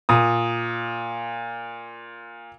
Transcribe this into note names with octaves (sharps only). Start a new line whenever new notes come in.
A#2 D#6